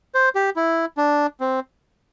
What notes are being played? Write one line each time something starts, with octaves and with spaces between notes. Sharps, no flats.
C5
G4
E4
D4
C4